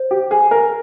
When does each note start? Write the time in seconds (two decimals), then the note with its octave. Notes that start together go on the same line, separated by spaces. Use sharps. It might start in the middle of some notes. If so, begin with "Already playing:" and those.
Already playing: C5
0.11 G4
0.31 G#4
0.51 A#4